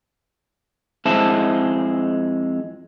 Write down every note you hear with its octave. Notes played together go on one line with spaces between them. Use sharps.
F2 G#3 E4 C5 E5 A5